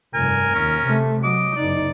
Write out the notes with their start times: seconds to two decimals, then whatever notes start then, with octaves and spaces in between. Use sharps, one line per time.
0.14 F1 G2 A#4 G#5
0.55 D#2 C#4
0.85 C3 A3
1.24 F#3 D#5 D6
1.56 F#1 D#4 D5